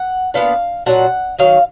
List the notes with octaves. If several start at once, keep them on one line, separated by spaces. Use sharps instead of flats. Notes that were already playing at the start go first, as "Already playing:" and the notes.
Already playing: F#5
A#2 F#3 B3 D4 F5
A#2 F#3 D4 F#5
D#3 F#3 F5